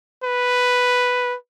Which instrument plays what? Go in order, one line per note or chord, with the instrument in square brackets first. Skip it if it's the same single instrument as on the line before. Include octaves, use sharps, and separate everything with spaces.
[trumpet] B4